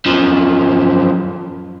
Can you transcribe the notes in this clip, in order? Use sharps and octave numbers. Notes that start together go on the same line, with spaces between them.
F#2 F3